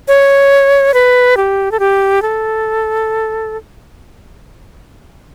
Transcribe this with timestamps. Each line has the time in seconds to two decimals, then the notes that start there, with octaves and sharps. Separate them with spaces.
0.08 C#5
0.94 B4
1.37 G4
1.72 A4
1.79 G4
2.22 A4